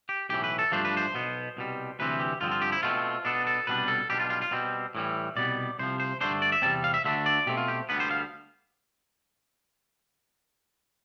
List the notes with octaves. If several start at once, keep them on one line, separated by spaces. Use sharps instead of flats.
G4
B1 A2 E3 G4
B4
A4
G2 F3 A3 D4 C5
B4
C5
B1 B2 B3
C2 B2 G3
D2 C3 E3 G3 C4 B4
G4
G2 D3 F3 C4 F4
F4
G4
E4
B2 A3 C4 F4
B2 B3 D4 A4
A4
C2 B2 G3 B3 D4 B4
A4
B1 B2 G3 D4 G4
F4
F4
F4
B2 G3 C4
A2 E3 G3
C2 B2 G3 B3 D5
C2 C3 F3 C5
C5
G2 D3 A3 D4 C5
D5
E5
E2 C3 G3 C4 A5
F5
E5
D2 D3 A3 D4 E5
D5
B2 A3 C4 G4
F4
G4
D2 D3 G3 B3 B4
C5
F5